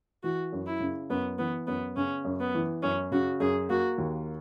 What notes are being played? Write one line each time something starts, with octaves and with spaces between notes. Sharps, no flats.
E3 F#4
F#2
E4
C#3
F#2 B3
E3 B3
F#2 B3
C#3 C#4
F#2
B3
E3
F#2 C#4
C#3 F#4
F#2 G#4
A#3 F#4
D#2